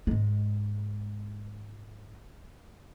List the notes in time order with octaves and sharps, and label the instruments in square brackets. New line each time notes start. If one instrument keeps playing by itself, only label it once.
[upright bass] G#2 G#3